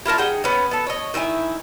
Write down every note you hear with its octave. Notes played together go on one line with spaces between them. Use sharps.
E4 F4 A#4 A5
D#4 G#4 F#5 G5
B3 C#4
B3 A4
C#5 D#5
D#3 E4 D5 G#5